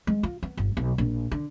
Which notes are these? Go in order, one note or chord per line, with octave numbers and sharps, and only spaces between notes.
G#3
F4
B3
G1
B1
A#1
D3